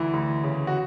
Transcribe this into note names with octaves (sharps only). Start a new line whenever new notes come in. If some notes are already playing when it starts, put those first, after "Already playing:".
Already playing: D2 E3 E4
D2
C#3
F#4